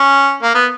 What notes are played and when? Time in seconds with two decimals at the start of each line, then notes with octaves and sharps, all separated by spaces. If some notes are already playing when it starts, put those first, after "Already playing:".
Already playing: C#4
0.43 A#3
0.54 B3